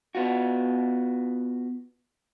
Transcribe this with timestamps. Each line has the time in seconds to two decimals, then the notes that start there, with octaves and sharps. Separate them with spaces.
0.15 B3 F4 F#4